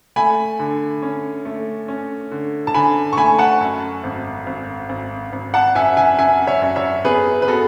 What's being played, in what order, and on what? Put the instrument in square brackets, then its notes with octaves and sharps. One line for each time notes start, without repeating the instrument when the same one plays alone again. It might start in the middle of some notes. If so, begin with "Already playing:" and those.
[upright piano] A3 G#5 B5
D3
C#4
A3
C#4
D3
A5
D3 G#5 B5
C#6
A3 G#5 B5
F#5 A5
F#2
G#1
G#1
G#1
G#1
F#5 A5
F#2 E5 G#5
E5 G#5
F#2 E5 G#5
C#5 E5
F#2
C#5 E5
B3 G#4 B4
B4
B3 F#4 A4